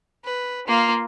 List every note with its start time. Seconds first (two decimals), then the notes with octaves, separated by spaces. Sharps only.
0.25 B4
0.68 A#3 F4